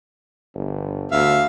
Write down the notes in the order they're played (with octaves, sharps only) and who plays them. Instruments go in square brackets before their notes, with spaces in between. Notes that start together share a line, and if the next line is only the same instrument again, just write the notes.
[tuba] G1
[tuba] D2 [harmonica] E5 F5